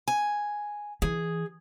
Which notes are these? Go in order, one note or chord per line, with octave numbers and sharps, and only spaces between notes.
G#5
E3 G#4